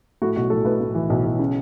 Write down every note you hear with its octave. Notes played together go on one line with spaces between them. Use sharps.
A2 F#4
B1 F#4
A2 A4
A2 B4
A2
E3
B1
B1
C#3